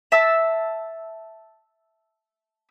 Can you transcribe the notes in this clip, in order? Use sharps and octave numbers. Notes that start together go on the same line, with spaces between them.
E5 A5 E6